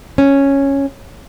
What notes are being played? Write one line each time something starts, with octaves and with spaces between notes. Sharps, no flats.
C#4